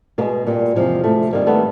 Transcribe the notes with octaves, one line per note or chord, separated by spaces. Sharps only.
B2 G#3 A#3
A#2 G3
E2 C3 F3 G#3
D2 C3 F3 A3
G#2 D#3 G3 A#3
A3 B3